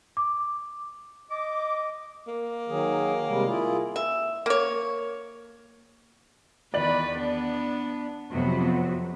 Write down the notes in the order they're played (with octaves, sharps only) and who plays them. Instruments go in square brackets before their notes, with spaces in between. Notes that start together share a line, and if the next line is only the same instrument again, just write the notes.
[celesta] D6
[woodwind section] D#5 D6
[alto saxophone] A#3
[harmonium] D#3 F#3 G#4
C3 G3 G#3
E4 F4 G#4
[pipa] E5
A#3 C#5
[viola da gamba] E2 D#3 B4 [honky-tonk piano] D5 F#7
[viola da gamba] B3 D4
[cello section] F2 C3 F#3 B3 F#4